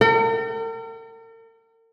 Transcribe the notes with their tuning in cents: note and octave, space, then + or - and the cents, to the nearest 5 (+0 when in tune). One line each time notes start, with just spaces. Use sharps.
A#4 -45 G5 -45